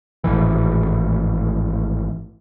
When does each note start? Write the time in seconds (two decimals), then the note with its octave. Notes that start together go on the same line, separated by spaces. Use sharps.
0.24 G#1 C#2 A2 E3